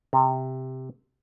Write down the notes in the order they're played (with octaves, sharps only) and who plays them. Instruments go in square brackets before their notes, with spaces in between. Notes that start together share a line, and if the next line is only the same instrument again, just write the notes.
[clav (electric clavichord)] C3